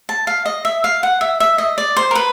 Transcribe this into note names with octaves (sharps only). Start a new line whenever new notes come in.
A5
F5
D#5
E5
F5
F#5
E5
E5
D#5
D5
C5
A#4
B4